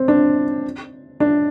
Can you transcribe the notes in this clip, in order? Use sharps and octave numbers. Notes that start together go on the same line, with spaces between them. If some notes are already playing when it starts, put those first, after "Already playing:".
Already playing: C4
D4
D4